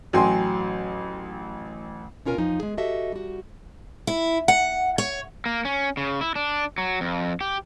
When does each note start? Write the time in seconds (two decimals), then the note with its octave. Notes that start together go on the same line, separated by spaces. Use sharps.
0.13 A1 F#3 G5 G#5 C6
2.25 B2 C#4 F4 A#4 G#5
2.38 E2 F3 D#4 G#5
2.60 G#3 G#4
2.78 F#4 G4 A4 D#5 E5
3.12 G3 F#4
4.07 E4
4.48 F#5
4.98 C#5
5.46 A#3
5.65 C#4
5.97 C#3
6.21 E4
6.36 D4
6.78 F#3
7.01 F2
7.41 G4